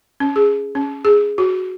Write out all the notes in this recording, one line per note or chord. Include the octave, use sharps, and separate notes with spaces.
C#4
G#4
C#4
G#4
F#4